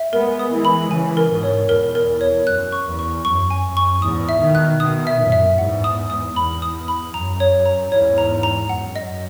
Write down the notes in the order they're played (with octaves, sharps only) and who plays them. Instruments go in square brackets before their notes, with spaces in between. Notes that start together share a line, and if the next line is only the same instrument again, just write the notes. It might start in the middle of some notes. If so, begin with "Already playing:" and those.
Already playing: [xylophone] E5
[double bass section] G#3 B3 [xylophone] A#4
[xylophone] D#6
[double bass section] E3 G#3
[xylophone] B5
[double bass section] C#3 E3 [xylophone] G#5
[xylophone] A#4
[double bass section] G#2 B2
[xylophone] C#5
[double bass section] E2 [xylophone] A#4
[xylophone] A#4
C#5
[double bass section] F#2 [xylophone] F#6
[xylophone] C#6
[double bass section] E2
[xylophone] C#6
[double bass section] F#2 [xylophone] C#6
[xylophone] G#5
[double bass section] F#2
[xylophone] C#6
[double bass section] E2 G#2 [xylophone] D#6
[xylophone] E5
[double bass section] B2 D#3
[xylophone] F#6
[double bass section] B2 D#3 [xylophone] D#6
[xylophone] E5
[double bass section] F#2 A#2
[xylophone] E5
[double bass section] E2 G#2 [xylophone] F#5
[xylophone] D#6
D#6
[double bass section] E2 [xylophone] B5
[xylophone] D#6
B5
[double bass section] F#2 [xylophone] A#5
[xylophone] C#5
A#5
[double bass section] E2 G#2 [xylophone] C#5
[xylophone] A#5
A#5
[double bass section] F#2 [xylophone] F#5
[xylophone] D#5